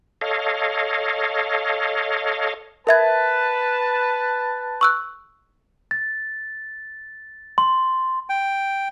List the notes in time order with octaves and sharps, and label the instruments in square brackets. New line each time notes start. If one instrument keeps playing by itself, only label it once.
[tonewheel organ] A4 C#5 D#5 F5
[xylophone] A#4 E5 G#6 [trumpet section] B4 A5
[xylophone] C#6 E6 F#6
[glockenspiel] A6
C6
[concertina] G5